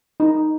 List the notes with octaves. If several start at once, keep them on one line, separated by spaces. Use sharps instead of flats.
D#4